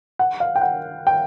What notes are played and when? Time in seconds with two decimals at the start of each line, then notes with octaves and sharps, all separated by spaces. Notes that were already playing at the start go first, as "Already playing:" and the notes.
0.19 F#5
0.40 F5
0.56 G5
0.62 F#5
1.07 G5